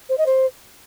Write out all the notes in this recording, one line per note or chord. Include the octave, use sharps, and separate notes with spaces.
C5
D#5
C5